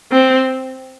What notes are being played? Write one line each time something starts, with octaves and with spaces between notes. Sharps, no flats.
C4